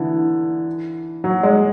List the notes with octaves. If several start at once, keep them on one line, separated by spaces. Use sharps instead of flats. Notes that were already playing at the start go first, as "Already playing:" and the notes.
Already playing: D3 E3
F#3
G#3